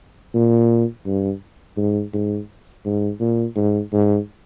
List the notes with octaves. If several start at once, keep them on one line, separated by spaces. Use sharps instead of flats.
A#2
G2
G#2
G#2
G#2
A#2
G#2
G#2